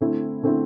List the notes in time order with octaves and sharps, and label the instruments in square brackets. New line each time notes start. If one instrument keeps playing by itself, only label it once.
[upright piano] D3 A3 C4 E4
D3 A3 C4 E4